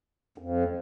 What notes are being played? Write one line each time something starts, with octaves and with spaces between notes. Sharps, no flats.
F2